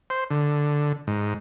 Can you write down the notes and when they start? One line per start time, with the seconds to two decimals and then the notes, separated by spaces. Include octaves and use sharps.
0.10 C5
0.30 D3
1.07 G#2